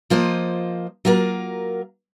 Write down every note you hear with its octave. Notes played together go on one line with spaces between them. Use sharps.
F3 A#3 F4 C5 D#5
F#3 A#3 F4 A#4